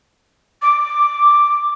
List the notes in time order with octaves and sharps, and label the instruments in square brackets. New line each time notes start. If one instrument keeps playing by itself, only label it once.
[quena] D6